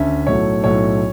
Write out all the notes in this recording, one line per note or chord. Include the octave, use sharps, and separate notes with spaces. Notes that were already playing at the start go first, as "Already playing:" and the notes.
Already playing: D2 D3 C#4 E5
B1 A2 F#3 A3 C#5
B1 A2 F#3 A3 C#5